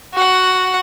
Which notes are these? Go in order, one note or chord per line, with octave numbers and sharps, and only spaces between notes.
F#4 F#5